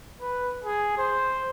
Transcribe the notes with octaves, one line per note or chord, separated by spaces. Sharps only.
B4
G#4
C5